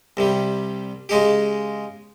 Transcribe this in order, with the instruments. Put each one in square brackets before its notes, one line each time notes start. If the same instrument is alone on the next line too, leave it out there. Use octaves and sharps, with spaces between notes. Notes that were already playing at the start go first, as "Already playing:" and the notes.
[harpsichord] C2 C3 G3
C#3 G#3 D#4 G4